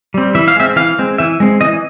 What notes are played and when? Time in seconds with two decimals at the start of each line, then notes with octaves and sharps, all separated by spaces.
0.14 G3 C4
0.35 E3 E5
0.48 F5
0.56 G#3 C4 E5
0.76 E3 F5
0.99 G#3 C4
1.18 E3 E5
1.40 G#3 C4
1.61 E3 D#5